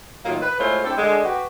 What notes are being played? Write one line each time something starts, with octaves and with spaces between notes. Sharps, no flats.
A2 D#3 F#3 A#3 F4
B4
G#3 A3 E4 F4 C5 C#5
C4 D4 E4 G4 A4
D3 G#3
F#4 G4 B4